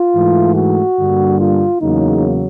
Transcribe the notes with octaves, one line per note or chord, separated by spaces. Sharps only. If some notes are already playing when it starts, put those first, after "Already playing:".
Already playing: F4
G#2 E3 A3
F#4
G2 D3 G3 A#3
F4
E2 C#3 F#3 A#3 D#4